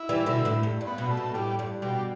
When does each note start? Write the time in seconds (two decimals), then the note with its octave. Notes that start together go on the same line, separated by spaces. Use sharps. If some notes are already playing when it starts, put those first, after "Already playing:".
Already playing: E4
0.09 E3 G3
0.26 B2 D3
0.45 A2
0.63 G2
0.81 G2
0.87 B3
0.98 B2
1.11 A3
1.17 B2
1.34 A2 G3
1.59 G2
1.82 B2 G3